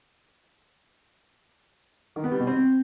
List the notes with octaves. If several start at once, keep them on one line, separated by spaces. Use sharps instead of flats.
D#3
B3
G3
B2
C4